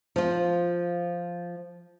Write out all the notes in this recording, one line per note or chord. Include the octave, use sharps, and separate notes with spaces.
F3 F4